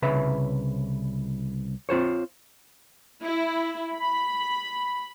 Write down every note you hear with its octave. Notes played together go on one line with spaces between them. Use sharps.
C2 C#3 B4 C#5 E5
C4 F4 C5 C#5
E4
B5